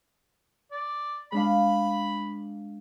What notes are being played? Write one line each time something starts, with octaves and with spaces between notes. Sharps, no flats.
D5
G#3 D4 F5 B5